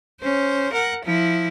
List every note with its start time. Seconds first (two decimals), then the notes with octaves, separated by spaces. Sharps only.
0.21 C#4 C5
0.72 A#4 F#5
1.05 F3 E4